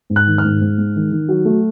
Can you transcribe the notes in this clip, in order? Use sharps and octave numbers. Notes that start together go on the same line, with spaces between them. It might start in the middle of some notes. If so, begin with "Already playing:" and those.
G#2
F#6
D#3
F6
G#2
G#2
G#3
D#3
D#3
F#3
A3